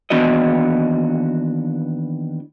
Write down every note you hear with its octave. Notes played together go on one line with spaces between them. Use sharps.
D#2 E3 B3 D4 F#4 D#5